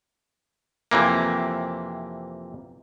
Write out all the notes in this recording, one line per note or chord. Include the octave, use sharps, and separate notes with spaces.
F2 C3 E3 A#3